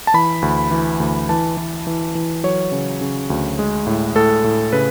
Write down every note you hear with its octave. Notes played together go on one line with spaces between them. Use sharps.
A5
E3 B5
D2
E3
D2
E3 A5
E3
E3
E3
F#3 C#5
C#3
C#3
D2
G#3
A2
A2 A4
A2
C#3 B4